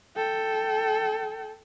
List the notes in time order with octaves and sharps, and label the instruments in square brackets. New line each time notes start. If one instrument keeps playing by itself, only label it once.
[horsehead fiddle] A4 G5